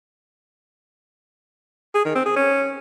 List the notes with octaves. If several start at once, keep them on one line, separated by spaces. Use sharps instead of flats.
G#4
D#3
C4
G#4
C#4